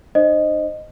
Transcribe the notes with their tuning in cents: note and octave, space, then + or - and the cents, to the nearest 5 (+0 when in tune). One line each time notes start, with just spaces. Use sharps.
D#4 -45 C5 +0 D#5 -10